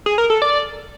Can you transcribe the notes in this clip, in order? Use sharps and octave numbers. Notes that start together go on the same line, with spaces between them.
G#4
A#4
A4
D5